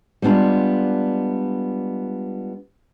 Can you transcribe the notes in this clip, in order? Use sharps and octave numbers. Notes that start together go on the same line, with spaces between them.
G3 G#3 B3 D4 F4